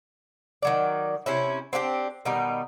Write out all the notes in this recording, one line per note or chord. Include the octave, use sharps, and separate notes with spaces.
D#3 F#3 D5
C3 C#4 E4
C4 D4 F4 G4
B2 D#3 G3 D#4